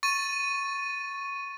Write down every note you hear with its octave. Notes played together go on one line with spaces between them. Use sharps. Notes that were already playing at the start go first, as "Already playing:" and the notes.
C#6 A6 D#7